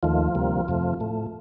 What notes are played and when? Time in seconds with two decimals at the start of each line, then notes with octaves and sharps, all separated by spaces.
0.03 D#2 D#3 F3 A3 F4
0.35 D2 C3 G3 A#3
0.68 F2 C3 F3 A3
1.00 A2 A3